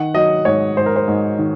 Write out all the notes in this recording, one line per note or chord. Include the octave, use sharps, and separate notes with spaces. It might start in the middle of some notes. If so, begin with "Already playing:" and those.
Already playing: D#3 F#5
F#3 D#5
G#2 C#5
G#2 C5
A#4
C5
G#2
D#3